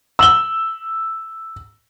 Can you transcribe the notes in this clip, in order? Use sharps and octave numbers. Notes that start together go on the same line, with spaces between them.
E6 F#7 G7